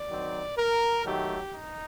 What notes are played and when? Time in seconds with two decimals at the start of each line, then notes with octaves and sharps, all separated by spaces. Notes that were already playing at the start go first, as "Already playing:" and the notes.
Already playing: D5
0.10 D#3 F#3 C4
0.58 A#4
1.05 D#3 F#3 A3 G4
1.53 D#4